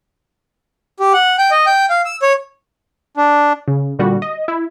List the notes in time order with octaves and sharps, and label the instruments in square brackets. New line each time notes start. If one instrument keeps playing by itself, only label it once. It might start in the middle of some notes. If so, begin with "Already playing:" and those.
[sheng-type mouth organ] G4
F#5
G5
D#5
G5
F5
E6
C#5
[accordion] D4
[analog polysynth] C#3
A#2 D3 G3 F#4
D#5
E4